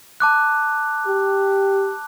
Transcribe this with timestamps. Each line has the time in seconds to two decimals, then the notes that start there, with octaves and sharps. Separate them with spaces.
0.20 A5 D6 F#6
1.06 G4